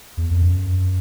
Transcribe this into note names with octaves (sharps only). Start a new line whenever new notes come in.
E2
F2
F#2